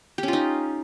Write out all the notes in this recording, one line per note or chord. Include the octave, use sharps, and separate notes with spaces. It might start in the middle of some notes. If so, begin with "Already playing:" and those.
C#4 D#4 F4 G4